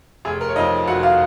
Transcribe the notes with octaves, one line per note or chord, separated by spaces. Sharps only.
F1 G#4
A#4
C#5
F2 F3 D#4 D#5
F1 F#4 F#5
F4 F5